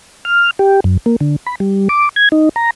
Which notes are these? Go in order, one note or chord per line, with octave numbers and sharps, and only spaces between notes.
F6
G4
F#2
A#3
D3
B5
G3
D6
G#6
D#4
A#5